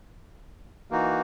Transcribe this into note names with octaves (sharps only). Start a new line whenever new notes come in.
E3 A#3 D#4 F#4